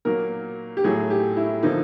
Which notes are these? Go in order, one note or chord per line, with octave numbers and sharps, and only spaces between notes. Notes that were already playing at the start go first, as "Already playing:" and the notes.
A#2 F#3 A#3 A#4
G4
A2 F#3 A3 G#4
G4
E4
D3 F3 A#3 D#4